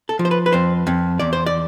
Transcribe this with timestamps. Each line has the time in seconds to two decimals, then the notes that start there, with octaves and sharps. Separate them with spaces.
0.09 A4
0.19 F3
0.25 C5
0.31 B4
0.46 B4
0.53 F2 C5
0.87 F2
1.19 E2 D5
1.33 C5
1.46 D5